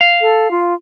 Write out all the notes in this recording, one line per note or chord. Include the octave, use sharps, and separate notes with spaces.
F5
A4
F4